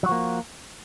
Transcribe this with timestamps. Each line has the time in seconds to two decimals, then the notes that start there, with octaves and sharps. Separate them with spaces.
0.03 F#3
0.06 F#4
0.09 F3
0.12 A#3